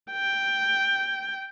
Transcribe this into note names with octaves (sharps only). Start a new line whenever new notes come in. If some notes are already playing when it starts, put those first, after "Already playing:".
G5